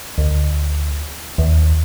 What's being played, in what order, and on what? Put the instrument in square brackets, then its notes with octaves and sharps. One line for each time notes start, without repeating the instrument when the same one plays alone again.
[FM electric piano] D2
D#2